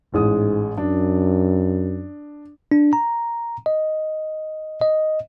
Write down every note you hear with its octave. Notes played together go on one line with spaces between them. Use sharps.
A1 G#2 G#3 D#6
F#2 D4
D4
A#5
D#5
D#5